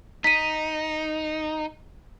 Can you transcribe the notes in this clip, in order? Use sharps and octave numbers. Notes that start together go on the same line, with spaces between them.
D#4 B6 D#7